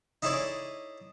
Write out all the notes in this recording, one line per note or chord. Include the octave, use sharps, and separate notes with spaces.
D#4 E4 G#4 A4 C#5 D5